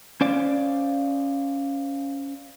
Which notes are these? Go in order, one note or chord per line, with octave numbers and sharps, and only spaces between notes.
C#4 C5 D5 F5